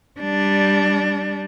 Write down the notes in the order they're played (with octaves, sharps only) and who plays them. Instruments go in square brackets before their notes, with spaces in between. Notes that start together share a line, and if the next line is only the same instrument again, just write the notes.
[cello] G3 D4